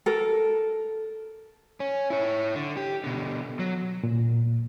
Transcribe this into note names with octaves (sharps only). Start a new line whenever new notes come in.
A4 A#4
C#4
E4 C#5
D3
G4
B2 D3
F#3
A#2